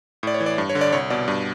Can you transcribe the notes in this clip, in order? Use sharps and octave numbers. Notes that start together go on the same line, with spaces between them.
A2 D5
C#5
E3
D5
G2
C#5
D3
D5
C2 C#5
B2 D5
G2